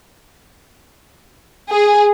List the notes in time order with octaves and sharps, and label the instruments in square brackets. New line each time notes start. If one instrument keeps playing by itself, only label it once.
[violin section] G#4